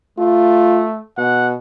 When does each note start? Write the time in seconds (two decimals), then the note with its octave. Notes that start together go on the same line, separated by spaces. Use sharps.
0.18 A3 F4
1.18 B2 F#5